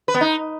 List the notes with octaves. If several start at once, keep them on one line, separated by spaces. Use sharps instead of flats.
B4
B3
D#4